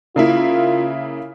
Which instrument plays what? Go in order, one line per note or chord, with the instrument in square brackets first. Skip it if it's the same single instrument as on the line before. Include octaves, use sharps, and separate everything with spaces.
[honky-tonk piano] C#3 A#3 E4 [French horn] F4